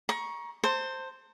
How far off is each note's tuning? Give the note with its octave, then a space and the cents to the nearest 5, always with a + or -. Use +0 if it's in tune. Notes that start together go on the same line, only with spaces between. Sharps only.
A#5 +30 C#6 +0
C5 +5 A5 +45